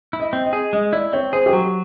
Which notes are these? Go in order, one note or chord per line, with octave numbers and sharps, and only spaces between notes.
E4
D#5
C4
D#5
G#4
G#3 D#5
E4 D5
C4 C#5
G#4 C5
G4
F#3 F#4